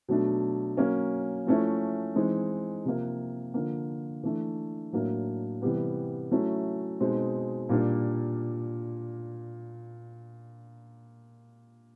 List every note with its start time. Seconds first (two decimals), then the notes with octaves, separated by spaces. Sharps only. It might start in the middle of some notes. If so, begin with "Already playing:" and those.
0.08 B2 F#3 A3 D4
0.77 F#3 A#3 C#4
1.47 F3 A3 C#4 E4
2.16 E3 G#3 C4 D#4
2.85 C3 F3 A#3
3.54 D3 F3 A#3
4.23 E3 A3 D4
4.93 A2 F#3 A#3 D4
5.62 C3 E3 G3 B3
6.31 F#3 A3 C#4 E4
7.01 B2 G#3 C4 D#4
7.69 A#2 G3 A#3 D4